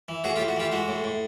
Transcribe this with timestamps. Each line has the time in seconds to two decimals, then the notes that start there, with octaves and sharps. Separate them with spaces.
0.08 E3
0.24 A2 F#4 G#4
0.36 F4 G4
0.40 A2
0.48 F#4
0.56 E3 F4 G4
0.72 G#3 F#4
0.88 A2
1.04 A2